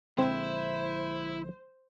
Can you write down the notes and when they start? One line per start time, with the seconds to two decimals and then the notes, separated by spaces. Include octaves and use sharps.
0.18 A#1 D3 G#3 C4 E4 C5 E5